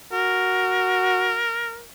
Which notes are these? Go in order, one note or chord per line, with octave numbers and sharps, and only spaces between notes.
F#4 A#4